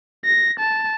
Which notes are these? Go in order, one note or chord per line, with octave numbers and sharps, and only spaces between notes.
A#6
A5